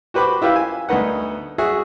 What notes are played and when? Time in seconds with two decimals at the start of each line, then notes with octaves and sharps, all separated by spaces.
0.14 F#4 G4 B4 C5 B5 D6
0.42 E4 F4 G4 B4 E5
0.56 G#5
0.89 D2 B3 D#4 B4 F#5
1.58 F#4 G#4 E5